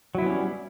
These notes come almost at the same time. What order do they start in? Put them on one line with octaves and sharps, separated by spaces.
F#3 E4 B3 C#4 G3